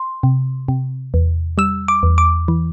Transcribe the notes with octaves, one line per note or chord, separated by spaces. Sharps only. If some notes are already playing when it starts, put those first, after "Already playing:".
Already playing: C6
C3
C3
E2
G3 E6
D6
E2
D6
E3